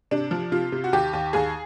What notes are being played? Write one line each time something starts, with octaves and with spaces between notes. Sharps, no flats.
C3 D4
F3
C3 F4
C3
F#4
D#2 G4
D#2
D#2 G#4